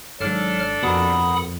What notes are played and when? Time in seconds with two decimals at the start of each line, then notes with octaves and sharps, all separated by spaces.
0.20 G#1 G#2 F#3 D4 A4 F6
0.83 F2 B2 A#4 F#5 B5 D#6